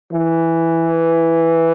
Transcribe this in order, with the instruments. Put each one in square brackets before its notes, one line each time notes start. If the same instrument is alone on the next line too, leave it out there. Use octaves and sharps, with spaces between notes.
[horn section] E3